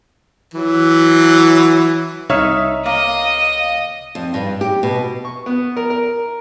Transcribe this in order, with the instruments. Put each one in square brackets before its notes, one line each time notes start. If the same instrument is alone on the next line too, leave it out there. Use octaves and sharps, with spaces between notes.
[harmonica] E3 F#3
[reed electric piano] C2 C#5 F6 [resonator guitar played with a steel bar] D#4 E5
[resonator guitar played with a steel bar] A#3 [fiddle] D#5 [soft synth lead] F5
[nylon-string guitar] F2
G2
G4
B2
[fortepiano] C#6
B3
A#4
A#4